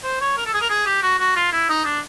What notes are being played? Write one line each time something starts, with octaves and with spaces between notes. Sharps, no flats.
C5
C#5
A#4
A4
G#4
A#4
G#4
G4
F#4
F#4
F4
E4
D#4
D4